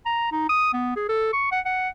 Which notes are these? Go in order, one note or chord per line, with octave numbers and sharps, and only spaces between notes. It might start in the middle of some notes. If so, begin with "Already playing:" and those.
A#5
D#4
D#6
B3
G#4
A4
C#6
F#5
F#5